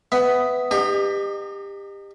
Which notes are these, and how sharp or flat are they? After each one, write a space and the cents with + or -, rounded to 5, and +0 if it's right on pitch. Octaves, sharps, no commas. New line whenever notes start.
B3 +15 E5 +0
D#4 -35 G4 +25